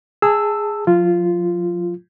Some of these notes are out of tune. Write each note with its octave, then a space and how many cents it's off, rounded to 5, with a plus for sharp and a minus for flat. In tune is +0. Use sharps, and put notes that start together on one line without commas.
G#4 -5 A5 +15 E6 +0
F3 +40 F4 -10